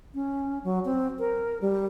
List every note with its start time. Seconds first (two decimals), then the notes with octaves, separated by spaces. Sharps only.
0.14 C#4
0.64 F#3
0.85 C4
1.19 A#4
1.61 G3